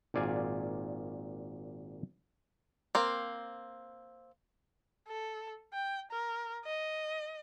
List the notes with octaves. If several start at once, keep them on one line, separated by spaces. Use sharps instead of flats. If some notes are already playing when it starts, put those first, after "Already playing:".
G#1 A#2 D5 F5 G#5
A#3 C4
A4
G5
A#4
D#5